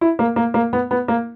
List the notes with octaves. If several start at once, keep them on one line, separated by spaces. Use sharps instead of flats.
E4
A#3
A#3
A#3
B3
B3
A#3